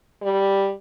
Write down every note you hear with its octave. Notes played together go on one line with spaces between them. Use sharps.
G3